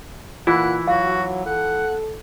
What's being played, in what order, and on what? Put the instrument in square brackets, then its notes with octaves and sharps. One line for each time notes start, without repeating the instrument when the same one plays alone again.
[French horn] A#2 [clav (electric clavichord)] E3 E4 [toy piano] F4 [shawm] F#5
[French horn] F#3 [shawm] F#4 [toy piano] F5
[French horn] A4 [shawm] F#5